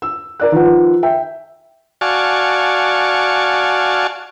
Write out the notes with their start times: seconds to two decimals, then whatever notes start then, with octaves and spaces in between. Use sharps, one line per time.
0.02 E6
0.40 A#4 D5 F#6
0.52 D#3 F3 B4 F#5
1.03 E5 G5
2.01 F#4 D5 F5 G#5 A5 C#6